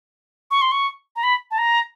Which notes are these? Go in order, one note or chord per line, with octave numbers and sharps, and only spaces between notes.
C#6
C6
C#6
A#5
B5
A5
A#5